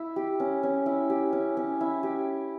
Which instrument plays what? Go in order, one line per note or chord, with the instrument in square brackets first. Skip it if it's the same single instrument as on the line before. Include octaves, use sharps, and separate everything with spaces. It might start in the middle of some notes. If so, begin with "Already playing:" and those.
Already playing: [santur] E4
G4
C#4
C#4
E4
G4
C#4
C#4
E4
G4